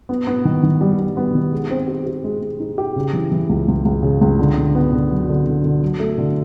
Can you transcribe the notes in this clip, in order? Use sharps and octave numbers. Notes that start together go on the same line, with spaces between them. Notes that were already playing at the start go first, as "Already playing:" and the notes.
B3
B3
D#3
D#3
G3
G3
B3
D#3
G#3
C4
G4
G4
G#3
G#3
D#4
G4
C#3
E3
E3
C#2
C#2
C#2
C#3
C#2
D3
D3
B3
D3
F#3
D3
D3
D3
F#3
A3
D3